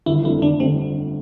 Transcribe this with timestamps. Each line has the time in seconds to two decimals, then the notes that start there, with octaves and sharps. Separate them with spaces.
0.06 G1 E4
0.24 F2 D3 A3 E4
0.42 G1 D4
0.60 D3 A3 C4